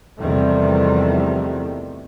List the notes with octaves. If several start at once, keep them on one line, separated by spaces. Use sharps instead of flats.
E2 C3 D#3 F3 G3 A3